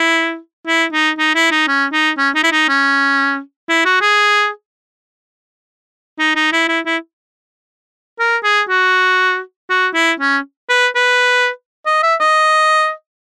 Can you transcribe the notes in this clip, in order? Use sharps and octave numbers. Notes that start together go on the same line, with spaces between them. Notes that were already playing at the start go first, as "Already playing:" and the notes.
Already playing: E4
E4
D#4
D#4
E4
D#4
C#4
D#4
C#4
D#4
E4
D#4
C#4
E4
F#4
G#4
D#4
D#4
E4
E4
E4
A#4
G#4
F#4
F#4
E4
C#4
B4
B4
D#5
E5
D#5